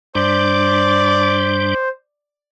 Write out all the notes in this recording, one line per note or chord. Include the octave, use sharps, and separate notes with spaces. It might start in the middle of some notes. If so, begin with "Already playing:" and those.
G2 G3 D4 C5 D5